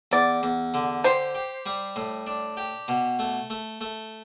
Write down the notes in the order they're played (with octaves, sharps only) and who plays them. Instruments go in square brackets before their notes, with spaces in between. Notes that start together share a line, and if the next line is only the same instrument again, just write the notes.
[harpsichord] E2 [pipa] D5
[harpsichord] E2
D3
[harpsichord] G4 [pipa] C5
[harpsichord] G4
G3
A2
D4
G4
B2
A3
A3
A3